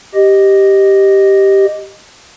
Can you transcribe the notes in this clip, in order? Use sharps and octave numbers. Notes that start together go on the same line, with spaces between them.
G4 D#5